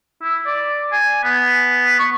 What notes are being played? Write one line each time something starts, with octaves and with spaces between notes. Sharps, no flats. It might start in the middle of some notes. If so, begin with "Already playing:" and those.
E4
D5
G#5
B3
C#6